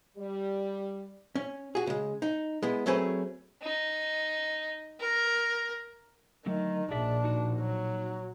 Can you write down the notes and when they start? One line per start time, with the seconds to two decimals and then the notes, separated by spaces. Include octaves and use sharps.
0.17 G3
1.35 C#4
1.75 F#4 G#4
1.87 C#3 G#3
2.22 D#4
2.63 G#3 B3 E4
2.86 F#3 A3 C4 C#4 G#4 B4
3.62 D#4
5.00 A#4
6.46 D3 D#3 F#3 A3
6.91 A#1 A#2 D4 G#4 D5 E5
7.24 D#4 F#4
7.60 F#3